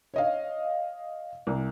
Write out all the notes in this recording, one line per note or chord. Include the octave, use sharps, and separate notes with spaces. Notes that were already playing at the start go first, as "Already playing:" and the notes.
C#5 D#5 F5
C2